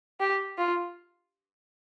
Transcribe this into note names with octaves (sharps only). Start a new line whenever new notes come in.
G4
F4